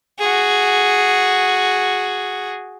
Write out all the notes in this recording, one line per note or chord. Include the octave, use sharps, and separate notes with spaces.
F#4 G#4